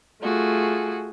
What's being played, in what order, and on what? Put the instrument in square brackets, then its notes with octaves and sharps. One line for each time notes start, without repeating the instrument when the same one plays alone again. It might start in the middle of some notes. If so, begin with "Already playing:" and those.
[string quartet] A3 F4 F#4 G#4